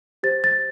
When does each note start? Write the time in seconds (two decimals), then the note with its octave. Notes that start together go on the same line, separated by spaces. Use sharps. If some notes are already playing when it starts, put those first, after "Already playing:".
0.23 G4 C5 A6
0.44 A6